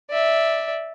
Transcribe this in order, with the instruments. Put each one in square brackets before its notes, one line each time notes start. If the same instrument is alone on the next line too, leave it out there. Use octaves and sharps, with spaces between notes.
[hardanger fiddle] D5 E5